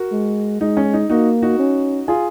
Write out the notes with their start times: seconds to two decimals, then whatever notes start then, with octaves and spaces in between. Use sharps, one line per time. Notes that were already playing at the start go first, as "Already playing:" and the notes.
Already playing: F#4 A#4
0.11 G#3
0.60 G#3 D#4
0.77 C#4
0.93 D#4
1.10 A#3 D#4 F#4
1.42 D#4 F#4
1.59 C#4
2.08 F4 G#4